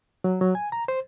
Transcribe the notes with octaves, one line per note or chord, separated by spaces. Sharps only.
F#3
F#3
G#5
A#5
C5